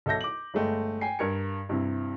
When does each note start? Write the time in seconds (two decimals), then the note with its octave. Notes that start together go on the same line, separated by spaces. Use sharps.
0.06 B1 A4 E5 G6 A#6
0.21 D6 F#7
0.54 G1 G#3 A3 G5
1.01 G5 G#5 C7
1.19 G2 A#4 G#6 C#7
1.69 G2 C3 E4